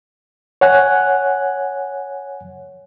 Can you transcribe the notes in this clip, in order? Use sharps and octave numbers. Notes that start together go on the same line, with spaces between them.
C#5 F#5 G#5 F#6